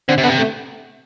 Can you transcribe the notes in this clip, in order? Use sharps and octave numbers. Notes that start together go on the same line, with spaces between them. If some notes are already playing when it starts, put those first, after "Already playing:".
D3 C4
C3
D3 B3
C3
A3